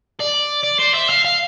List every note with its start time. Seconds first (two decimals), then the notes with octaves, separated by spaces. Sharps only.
0.20 D5
0.64 D5
0.79 C5
0.94 E5
1.09 F5
1.25 F5